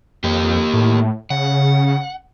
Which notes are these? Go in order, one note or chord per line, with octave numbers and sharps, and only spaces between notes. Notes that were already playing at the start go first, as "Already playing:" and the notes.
F2 A#3 G4
A2
C#3 F#5